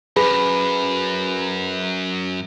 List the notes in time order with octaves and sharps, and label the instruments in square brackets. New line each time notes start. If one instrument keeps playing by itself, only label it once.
[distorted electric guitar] F#2 [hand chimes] G#4 B4 B5